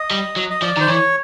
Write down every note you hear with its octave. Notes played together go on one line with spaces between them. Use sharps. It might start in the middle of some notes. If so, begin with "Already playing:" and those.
Already playing: D#5
G3
F#3
D#5
F3 D5
D#3 C5
E3 C#5